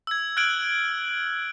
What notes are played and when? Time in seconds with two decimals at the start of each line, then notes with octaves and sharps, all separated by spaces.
0.07 E6 G#6
0.37 F6 F#6 G#6 D7 F#7